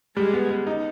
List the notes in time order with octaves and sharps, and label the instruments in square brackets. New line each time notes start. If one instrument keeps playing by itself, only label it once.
[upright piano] G3 [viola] G#3
[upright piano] B3
B3
D#4